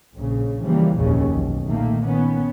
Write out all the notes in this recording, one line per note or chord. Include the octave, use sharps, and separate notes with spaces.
A#1 A#2 C#3
C#3 E3 F3 G3 A#3
F1 A#1 D#2 C#3 C#4
B1
A#2 D#3 A3 A#3
D#3 B3 C#4